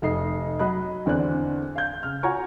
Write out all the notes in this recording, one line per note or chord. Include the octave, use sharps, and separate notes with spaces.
F1 D#4 C7
F#3 D#5 B5 F#6
E2 D3 C4 D5 F#6
F5 G6
C#3 F6
F4 F#4 C#5 G#5 A#5 C#6